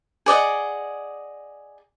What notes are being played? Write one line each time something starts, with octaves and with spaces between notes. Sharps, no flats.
G#4 D5 D#5 F#5